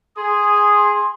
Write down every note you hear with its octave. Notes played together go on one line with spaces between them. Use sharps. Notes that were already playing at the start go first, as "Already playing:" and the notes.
G#4 C6 D#6